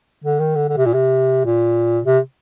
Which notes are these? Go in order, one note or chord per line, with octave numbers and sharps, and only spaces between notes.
D3
D#3
D3
D3
C3
A#2
C3
A#2
C3